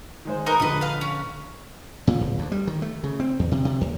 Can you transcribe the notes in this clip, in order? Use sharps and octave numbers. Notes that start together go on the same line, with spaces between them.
D#3 G#3 C5
D#4 A#4 B4
A#1 D3 B4 D#5
B4 F5
C#4
A#2
D1
D2
G3
D#3
A3
C#3
C4
E2
C3
C3
D#2